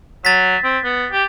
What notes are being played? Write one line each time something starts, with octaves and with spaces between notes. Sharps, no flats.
F#3 A6 B6
C4
B3
G4